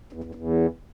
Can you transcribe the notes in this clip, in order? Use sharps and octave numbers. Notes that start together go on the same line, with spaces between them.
E2
E2
E2